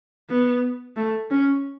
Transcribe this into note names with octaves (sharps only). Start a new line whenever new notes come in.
B3
A3
C#4